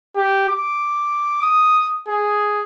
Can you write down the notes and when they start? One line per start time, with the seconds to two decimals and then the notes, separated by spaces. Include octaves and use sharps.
0.16 G4
0.49 D6
1.42 D#6
2.08 G#4